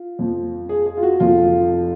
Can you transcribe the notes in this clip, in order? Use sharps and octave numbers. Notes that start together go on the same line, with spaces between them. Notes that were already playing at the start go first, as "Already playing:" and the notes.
Already playing: F4
F2 F3
G#4
G#4
F4
F#4
F1 F2 F3 F4